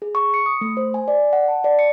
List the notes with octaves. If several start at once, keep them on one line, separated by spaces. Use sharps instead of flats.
G#4
C#6
C#7
D#6
A3
C5
G#5
D5
F#5
A5
D5
C#7